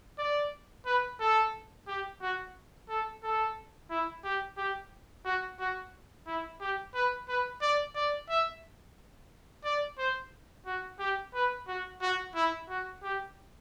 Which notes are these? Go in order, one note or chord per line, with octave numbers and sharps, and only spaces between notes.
D5
B4
A4
G4
F#4
A4
A4
E4
G4
G4
F#4
F#4
E4
G4
B4
B4
D5
D5
E5
D5
C5
F#4
G4
B4
F#4
F#4
E4
F#4
G4